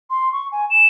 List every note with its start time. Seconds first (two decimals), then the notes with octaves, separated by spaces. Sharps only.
0.10 C6
0.33 C#6
0.52 G#5
0.70 E7